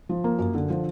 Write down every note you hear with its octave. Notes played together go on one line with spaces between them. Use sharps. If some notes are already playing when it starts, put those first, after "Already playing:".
F3
A#3
F#2
D3
F3